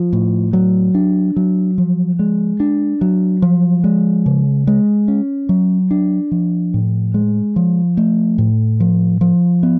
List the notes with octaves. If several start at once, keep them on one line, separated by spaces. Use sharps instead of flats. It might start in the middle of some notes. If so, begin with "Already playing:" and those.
Already playing: F3
A2
F#3
D4
F#3
F3
G#3
D4
F#3
F3
G#3
C#3
G#3
C#4
F#3
D4
F3
A2
G#3
F3
A3
A2
F3
F3
B3